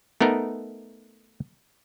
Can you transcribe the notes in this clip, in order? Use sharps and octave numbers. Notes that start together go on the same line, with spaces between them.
A3 B3 D#4 A#4